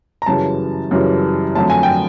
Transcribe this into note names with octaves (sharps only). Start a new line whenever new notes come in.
A#5
F#2 C#3 E3 G3 A5
F#2 C#3 E3 G3
F2 D3 F#3 A3 A5
G#5
G5